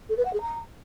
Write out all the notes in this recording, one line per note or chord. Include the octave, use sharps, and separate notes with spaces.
A4
B4
F#5
G#4
A#5